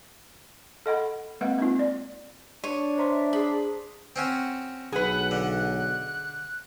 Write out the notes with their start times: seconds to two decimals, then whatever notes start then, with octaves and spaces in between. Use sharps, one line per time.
0.86 A4 D#5 F#5 B5
1.41 G#3 A#3 C4 B4 E5 F#5
1.59 C4 D#4 F4
1.79 D5
2.64 D4 C#5 D#7
2.98 C5 E5 A#5 C6
3.33 G#4 B5
4.16 C4 C#4 F#4
4.92 B1 G#4 B4 F#5
5.31 D3 F#6